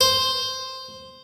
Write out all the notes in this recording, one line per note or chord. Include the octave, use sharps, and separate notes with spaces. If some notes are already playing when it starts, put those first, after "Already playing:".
C5